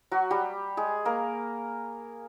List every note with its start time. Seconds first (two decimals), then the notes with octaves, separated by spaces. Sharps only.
0.11 F#3 F#4
0.31 G3 G4
0.77 G#3 G#4
1.05 A#3 A#4